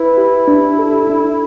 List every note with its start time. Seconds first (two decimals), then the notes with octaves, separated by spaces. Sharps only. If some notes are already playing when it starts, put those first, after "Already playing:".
Already playing: E4 B4
0.17 G4
0.48 D4
0.79 A4
1.10 D4